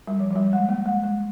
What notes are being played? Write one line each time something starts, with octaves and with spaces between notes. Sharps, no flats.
G3
F3
F3
G3
G#3
A#3
G#3
G#3